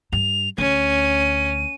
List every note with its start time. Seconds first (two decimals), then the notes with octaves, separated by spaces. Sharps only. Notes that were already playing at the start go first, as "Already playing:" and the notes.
0.12 G2 F7
0.58 D2 C#4 D#7